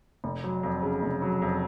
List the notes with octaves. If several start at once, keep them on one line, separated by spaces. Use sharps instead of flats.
F1
F#3
F2
C#3
F1
F#3
F2